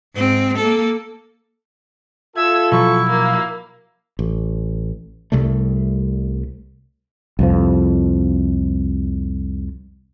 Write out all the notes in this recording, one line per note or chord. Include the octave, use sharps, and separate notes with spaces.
G#2 C4
A#3 A4
F4 A4 E5 E6 G#6
B2 F3 F#3 E4 C#6
A#2 A#3 F5
A1
C2 C3 G3 A3
C2 F2 F3